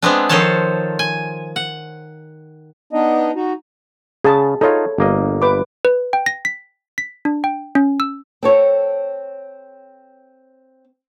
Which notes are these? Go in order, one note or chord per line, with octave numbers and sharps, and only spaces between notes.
G#3 B3 C4 D4
D#3 F3 A4 C5 C#5 A5
G#5
F#5
B3 D4 D#4 D#5
D#4 F#4
C#3 G#4 A5
D#4 F4 A4 C#5
G1 A#3 D#5
B4 D6
B4
G5
A#6
B6
B6
D4
G5
C#4
E6
C4 A4 C#5